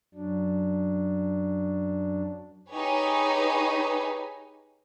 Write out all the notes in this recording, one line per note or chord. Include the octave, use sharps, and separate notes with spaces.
F#2 F#3 D4
D#4 G4 G#4 B4 C#5